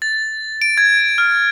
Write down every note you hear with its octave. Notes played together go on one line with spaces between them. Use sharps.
A6
D7
G#6
F6